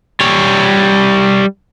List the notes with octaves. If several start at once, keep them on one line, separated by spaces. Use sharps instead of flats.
G3 C#5